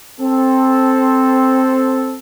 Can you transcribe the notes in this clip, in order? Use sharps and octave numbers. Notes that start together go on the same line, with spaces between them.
C4 A4